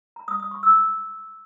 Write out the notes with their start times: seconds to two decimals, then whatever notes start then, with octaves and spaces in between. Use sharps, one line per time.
0.16 A#5
0.28 D#6
0.40 D#6
0.51 C#6
0.63 E6